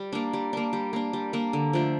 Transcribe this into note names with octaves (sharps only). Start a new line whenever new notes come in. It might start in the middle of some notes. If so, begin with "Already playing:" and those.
Already playing: G3
A#3 D4
G3
A#3 D4
G3
A#3 D4
G3
A#3 D4
D3
F3 A3 D4